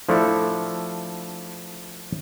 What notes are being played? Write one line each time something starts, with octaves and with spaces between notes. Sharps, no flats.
F3 A3 D4 E4 A4